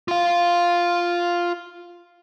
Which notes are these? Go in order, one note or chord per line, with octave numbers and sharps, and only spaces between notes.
F4 F5